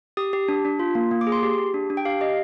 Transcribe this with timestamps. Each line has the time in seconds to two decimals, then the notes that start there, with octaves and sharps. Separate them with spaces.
0.17 G4 D#6
0.33 G4
0.48 D4
0.65 D4
0.79 F4
0.95 A#3
1.11 A#3
1.21 D6
1.27 G#4
1.32 C6
1.43 G4
1.58 G4
1.74 D4
1.90 D4
1.97 G5
2.05 G4 F5
2.21 G4 D#5